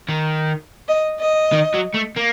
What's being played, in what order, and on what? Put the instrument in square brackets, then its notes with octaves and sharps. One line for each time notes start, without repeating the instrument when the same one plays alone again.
[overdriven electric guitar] D#3
[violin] D#5
D#5
[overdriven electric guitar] D#3
F#3
A3
A#3